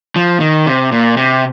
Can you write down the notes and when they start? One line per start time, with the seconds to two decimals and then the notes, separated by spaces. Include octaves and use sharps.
0.16 F3
0.40 D#3
0.67 C3
0.92 A#2
1.17 C3